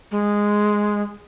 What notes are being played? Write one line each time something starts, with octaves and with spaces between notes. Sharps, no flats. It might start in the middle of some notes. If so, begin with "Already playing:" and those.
G#3